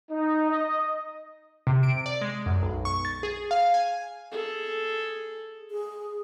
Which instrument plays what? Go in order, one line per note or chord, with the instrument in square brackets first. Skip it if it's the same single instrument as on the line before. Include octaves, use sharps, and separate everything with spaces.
[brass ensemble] D#4
D#5
[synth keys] C3
D7
D5
G#3
F#2
B1
C#6
A6
G#4
F5
G#5
[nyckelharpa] G#4 A4
[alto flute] G#4